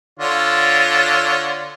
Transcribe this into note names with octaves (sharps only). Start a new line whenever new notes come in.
D3 F4 C#5